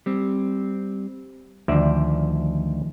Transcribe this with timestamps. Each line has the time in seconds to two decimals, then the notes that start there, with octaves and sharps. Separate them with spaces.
0.06 G3 C4
1.68 D2 D#3 F3 D5 E5